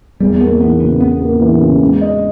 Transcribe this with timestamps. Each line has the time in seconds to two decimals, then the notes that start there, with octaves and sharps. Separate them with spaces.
0.20 E2 G3
0.40 A#3 B3
0.61 E3 B3
0.80 C#3 B3
1.00 E2 B3
1.21 A#3
1.41 E3
1.60 C#3
1.81 G#3
2.01 D#5